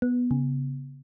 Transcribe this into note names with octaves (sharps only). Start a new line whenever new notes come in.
B3
C#3